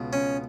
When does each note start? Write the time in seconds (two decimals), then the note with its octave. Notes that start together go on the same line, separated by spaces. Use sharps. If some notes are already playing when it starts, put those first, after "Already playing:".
Already playing: C#2 B2
0.13 C#4